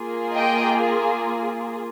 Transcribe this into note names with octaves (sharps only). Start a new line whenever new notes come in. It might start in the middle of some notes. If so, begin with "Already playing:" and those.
Already playing: A#3 F4 G#4
D#5 G5